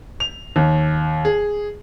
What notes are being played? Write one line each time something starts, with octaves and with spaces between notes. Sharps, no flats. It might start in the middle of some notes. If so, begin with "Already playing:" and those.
F7
D#2
G#4